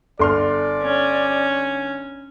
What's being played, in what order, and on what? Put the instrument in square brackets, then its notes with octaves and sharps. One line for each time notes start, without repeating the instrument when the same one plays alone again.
[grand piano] G1 C6 F6 [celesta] A4 [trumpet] D5
[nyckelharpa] C#4